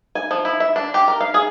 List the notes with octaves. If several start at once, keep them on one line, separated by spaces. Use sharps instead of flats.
G#5
F3
E4
E5
D4
G4
A#4
F5
G#4